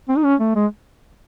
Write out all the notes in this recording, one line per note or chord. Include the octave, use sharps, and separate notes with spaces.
C4
D#4
C#4
A3
G#3